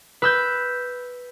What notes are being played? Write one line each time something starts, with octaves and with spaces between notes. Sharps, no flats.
B4 E6 G6